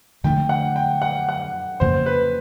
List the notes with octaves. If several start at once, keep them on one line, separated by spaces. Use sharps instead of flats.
F2 D3 F3 A3 G5
F#5
G5
F#5
F#5
F2 C#3 F3 A#3 C5
B4